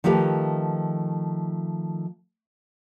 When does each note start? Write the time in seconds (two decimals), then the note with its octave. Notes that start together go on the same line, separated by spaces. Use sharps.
0.04 D#3 F3 A3 G4 B4